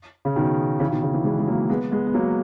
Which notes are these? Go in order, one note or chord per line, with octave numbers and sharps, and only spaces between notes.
C#3
B2 D#3
C#3 E3
B2 D#3
C#3
C#3 E3
E3 G#3
G#3
F#3 A#3
G#3 B3
G#3 B3
B3
F#3 A#3